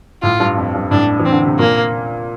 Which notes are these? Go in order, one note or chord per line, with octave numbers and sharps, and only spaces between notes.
A2 F4
G2
F2
G2
A2 D4
E3
C4
D3
C3
A#2 A#3